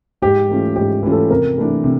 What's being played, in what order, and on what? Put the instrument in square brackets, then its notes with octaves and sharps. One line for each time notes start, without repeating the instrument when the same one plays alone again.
[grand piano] G#2 [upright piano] G4
[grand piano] E3 A3 C#4 F4
[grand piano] G#2 [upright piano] G4
[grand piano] E3 A3 C#4 F4
[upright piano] A4
[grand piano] C3 [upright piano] A#4
[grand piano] E3 A3 D4
C3